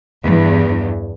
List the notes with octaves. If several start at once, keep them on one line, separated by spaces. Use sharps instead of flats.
E2 G2